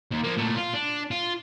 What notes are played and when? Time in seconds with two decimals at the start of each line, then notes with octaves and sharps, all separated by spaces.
0.11 D#2
0.24 F3 A#3
0.37 A#2 A3
0.56 F4
0.74 D4
1.11 F4